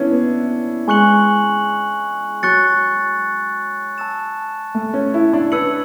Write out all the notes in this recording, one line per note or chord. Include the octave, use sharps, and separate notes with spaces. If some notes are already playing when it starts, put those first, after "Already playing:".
Already playing: B3 C#4 D4 E4
B3
G#3 G#5 C#6 F#6 C#7 F#7
F#3 C#6 F#6 A6 C#7
A5 E6 A6 E7
A3
C#4
E4
D4
B4 E6 G#6 C#7 F#7